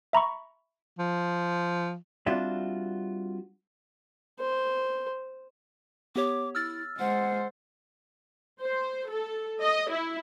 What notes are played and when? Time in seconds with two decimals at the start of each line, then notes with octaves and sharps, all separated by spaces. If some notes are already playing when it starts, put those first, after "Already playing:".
0.13 E5 A#5 B5 C#6
0.99 F3
2.27 G3 C4 D4 F4 F#4 E5
4.40 C5
6.16 B3 G4 C#5 D6
6.55 E4 E6 F6 A6
6.99 G#3 C5 F#5
8.62 C5
9.09 A4
9.62 D#5
9.91 E4